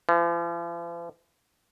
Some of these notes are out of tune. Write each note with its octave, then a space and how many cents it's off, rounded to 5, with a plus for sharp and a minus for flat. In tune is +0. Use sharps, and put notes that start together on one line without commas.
F3 -45